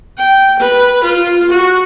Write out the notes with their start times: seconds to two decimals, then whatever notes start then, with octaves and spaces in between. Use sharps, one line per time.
0.17 G5
0.60 B4
1.04 F4
1.51 F#4